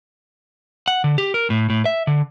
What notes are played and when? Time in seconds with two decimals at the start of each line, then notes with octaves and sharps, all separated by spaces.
0.88 F#5
1.04 D3
1.18 G4
1.34 A#4
1.50 A2
1.70 A2
1.85 E5
2.07 D3